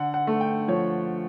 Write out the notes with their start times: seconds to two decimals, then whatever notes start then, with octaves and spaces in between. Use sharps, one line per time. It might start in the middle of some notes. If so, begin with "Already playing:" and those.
Already playing: D3 F#5
0.14 F#5
0.27 A3
0.41 G5
0.68 F3 C#5